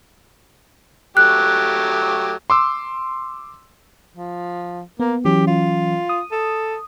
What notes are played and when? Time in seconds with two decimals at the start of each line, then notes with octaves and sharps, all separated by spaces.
1.17 F#3 A3 G4 F#6
2.50 C6 D6 E6
4.17 F3
5.00 A#3 B3
5.25 E3 F#3 C#4 G4
5.47 F4
6.09 D#6
6.31 A4